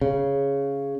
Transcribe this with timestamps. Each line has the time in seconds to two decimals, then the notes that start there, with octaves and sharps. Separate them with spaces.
0.01 C#3